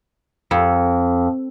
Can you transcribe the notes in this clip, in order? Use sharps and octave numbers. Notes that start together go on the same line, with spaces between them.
F2